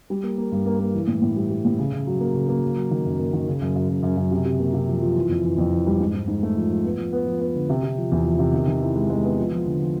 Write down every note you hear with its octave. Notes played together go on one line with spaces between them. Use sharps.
G3
A#3
A#3
G2
A#3
A#3
E3
A2
A2
G3
G3
A2
C#3
C#3
F#3
A#3
C#3
A#3
F#3
F#3
D#3
F#2
A#3
D#3
C#3
F#2
F#2
F#2
F#2
F#2
C3
C3
A#3
C3
F3
F3
E3
F2
E3
F2
E3
G3
G#2
G#2
G#2
A3
F3
F3
B3
F3
B3
F3
B3
D3
C3
C3
F3
E2
F3
C3
D#3
D#3
E4
G#3
G#3
B3
F3
F3
D3
F3